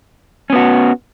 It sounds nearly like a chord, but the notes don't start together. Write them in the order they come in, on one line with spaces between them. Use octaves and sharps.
C#4 B3 F#4